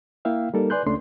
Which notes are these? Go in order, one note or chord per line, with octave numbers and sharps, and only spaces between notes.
A#3 E4 E5 F5 G5
G3 A#3 D#4 A4 A#4
B4 D5 G#5 C6 F#6 G6
C#2 A3 C#4 D4 C6